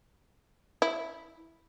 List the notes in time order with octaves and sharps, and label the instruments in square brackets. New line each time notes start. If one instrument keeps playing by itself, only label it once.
[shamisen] E4